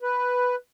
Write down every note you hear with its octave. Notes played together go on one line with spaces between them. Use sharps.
B4